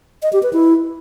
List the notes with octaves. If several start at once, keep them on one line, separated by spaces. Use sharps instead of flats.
D#5
G4
B4
E4